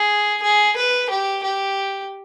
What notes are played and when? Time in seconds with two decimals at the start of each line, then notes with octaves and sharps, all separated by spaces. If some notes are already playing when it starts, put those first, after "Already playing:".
Already playing: G#4
0.43 G#4
0.77 B4
1.10 G4
1.43 G4